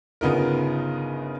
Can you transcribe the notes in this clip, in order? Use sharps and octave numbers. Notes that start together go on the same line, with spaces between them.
G1 C#3 B3 D#4 F4 A#4